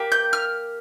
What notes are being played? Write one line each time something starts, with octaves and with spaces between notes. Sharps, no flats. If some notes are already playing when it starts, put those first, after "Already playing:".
Already playing: A#3 G4
G6
F6